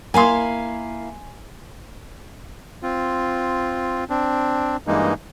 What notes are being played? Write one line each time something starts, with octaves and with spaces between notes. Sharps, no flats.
A#3 E4 F5 G#5 C6
C4 F4
C4 D4
G2 E3 G#3 A#3 D#4